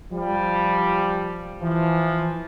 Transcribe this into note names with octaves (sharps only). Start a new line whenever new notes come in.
F3 G3
E3 F3